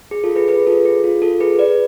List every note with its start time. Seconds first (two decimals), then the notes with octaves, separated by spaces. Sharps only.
0.11 G#4
0.24 F4 A4
0.36 G#4 B4
0.48 G#4 B4
0.67 F4 A4
0.85 G#4
1.04 F4
1.22 F4 A4
1.40 G#4 B4
1.59 B4 D5